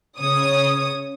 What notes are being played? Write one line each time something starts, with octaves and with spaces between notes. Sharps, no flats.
C#3 C#5 D#6